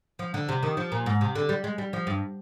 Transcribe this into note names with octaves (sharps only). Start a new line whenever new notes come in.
F3
D3
C3
D#3
F3
A#2
G#2
C3
D3
G3
G#3
G3
F3
G2